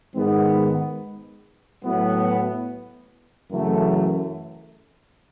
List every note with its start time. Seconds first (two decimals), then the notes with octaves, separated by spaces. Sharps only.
0.14 G#2 D#3 G#3 B3
1.83 A2 F#3 B3
3.51 F#2 C#3 E3 A3